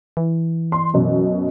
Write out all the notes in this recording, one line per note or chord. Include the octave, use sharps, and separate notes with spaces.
E3
C6
F#2 B2